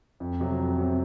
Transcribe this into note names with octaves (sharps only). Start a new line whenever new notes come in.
F2
C3 F#3
F2
C3 F#3